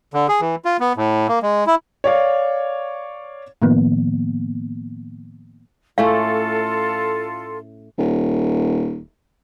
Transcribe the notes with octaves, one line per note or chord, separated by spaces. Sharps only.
D3
G#4
E3
F4
B3
A2
A#3
G#3
E4
C#5 D5 F5
A2 D#3 F3 A#3 B3
A2 A3 C#4 F4 A4 F5
D#1